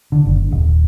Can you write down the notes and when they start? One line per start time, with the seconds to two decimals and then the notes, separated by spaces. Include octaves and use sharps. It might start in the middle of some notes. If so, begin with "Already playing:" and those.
0.12 D3
0.25 F#1
0.51 D#1